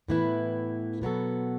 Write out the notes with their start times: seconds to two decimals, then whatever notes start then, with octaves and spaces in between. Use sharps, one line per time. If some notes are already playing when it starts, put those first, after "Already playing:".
0.08 A2 E3 B3 E4 B4
1.01 B2 F#3 B3 F#4 A4